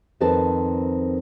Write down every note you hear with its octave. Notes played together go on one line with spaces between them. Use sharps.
F2 D#3 C4 A4 B4 A5